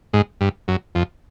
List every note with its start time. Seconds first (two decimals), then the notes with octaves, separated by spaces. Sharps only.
0.13 G#2
0.41 G2
0.68 F#2
0.95 F2